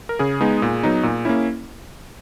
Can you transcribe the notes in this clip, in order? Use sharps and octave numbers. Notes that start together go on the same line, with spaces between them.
A#4
C#3 G#4
G#3 B3 D#4
A#2
F#3 B3 D#4
A#2
A#3 C#4 E4